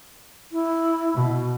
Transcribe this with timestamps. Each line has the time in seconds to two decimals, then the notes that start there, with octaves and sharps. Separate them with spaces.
0.52 E4
1.15 B2